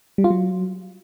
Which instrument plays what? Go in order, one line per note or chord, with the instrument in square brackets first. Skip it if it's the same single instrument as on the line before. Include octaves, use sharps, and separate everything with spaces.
[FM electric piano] G3
F4
F#3